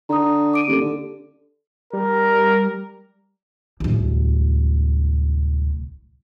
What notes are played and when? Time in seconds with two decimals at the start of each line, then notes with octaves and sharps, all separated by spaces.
0.09 D3 A#5 D#6
0.54 D6 D7 D#7
0.68 D#1 G4 A4
0.80 D3 A4
1.93 G3 A#4
3.80 D1 C2